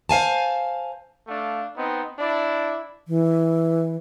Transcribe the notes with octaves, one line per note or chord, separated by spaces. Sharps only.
C5 F5 G#5 A5
A3 D4 F5
B3 C4 D#4
D4 E4 D5
E3